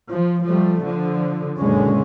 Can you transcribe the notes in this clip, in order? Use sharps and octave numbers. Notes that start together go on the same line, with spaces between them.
F3
F3 G3 A3
D3 F3
F#1 A#2 D3 G#3 C#4